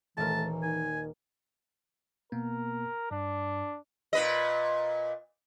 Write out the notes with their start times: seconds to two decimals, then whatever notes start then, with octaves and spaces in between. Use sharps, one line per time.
0.17 D#1 E3 A3 A#4 A5
0.63 D#3 G#5
2.32 B2 A#3 B3 A#4
3.11 G2 D4
4.13 A#2 B4 D#5